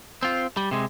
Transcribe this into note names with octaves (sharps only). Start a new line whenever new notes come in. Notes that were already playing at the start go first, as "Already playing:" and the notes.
C4 F4
G3
C3 G#3